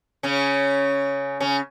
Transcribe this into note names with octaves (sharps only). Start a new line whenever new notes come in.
C#3 C#4
C#3 C#4